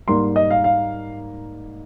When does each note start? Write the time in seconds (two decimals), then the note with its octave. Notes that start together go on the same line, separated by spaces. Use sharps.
0.08 G#2 G3 A#3 C6
0.36 D#5
0.51 F5
0.64 F5